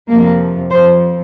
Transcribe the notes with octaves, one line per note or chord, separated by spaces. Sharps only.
F2 C3 F3 A#3
F2 F3 C5